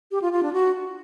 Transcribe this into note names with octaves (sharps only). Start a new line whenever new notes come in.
G4
F4
F4
D4
F#4